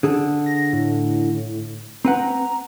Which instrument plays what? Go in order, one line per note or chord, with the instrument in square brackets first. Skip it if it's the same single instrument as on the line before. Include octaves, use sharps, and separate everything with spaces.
[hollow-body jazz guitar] D3 G#4 A4
[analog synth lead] A#6
A2
[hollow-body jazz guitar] C4 B4 F#5 [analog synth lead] A#5